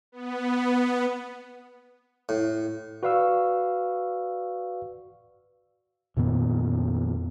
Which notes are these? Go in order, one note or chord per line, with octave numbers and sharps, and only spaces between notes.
B3
A2
F#4 B4 D5 F5 C#6 E6
F2 A#2 D#3 B3